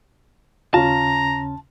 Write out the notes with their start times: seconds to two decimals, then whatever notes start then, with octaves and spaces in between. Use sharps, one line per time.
0.74 D#2 C#3 C#4 F4 A5 A#5